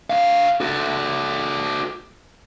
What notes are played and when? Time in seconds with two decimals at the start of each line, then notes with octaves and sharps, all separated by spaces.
0.10 D3 F5
0.60 F#4 A4